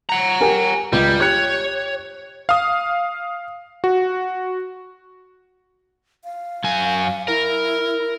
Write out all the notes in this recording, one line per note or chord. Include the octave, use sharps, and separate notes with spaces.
F#5 A#5
G4 A#4 G#5
C#2 G3
G4 C#5 F#6 C#7
F5 D#6
F#4
F5
F#2 G#5
E4 A#4